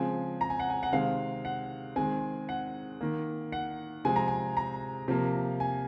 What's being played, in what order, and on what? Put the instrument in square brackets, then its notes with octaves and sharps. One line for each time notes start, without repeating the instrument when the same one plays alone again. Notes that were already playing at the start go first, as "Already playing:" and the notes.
Already playing: [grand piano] C#3 F3 G#3 C4 G#5
A#5
G#5
F#5
G#5
F#5
C3 D#3 G#3 C4 F5
F#5
D#3 G#3 C4 G#5
F#5
D#3 A#3
F#5
C3 F3 G#3 C4 G#5
A#5
G#5
A#5
C3 F3 A#3
G#5